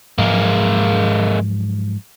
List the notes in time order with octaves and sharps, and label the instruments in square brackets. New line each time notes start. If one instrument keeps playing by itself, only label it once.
[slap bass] G#2 F3 F#3 [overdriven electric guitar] G#3 A#3